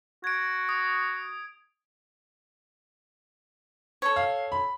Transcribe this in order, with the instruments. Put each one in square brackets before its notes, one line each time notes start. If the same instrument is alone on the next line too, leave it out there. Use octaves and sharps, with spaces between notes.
[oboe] F#4 [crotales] G#6 D7
[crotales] D#6
[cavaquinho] A4 C#5
[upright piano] F5
B5